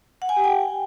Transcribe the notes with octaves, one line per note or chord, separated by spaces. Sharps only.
F#5
G#5
G4
G5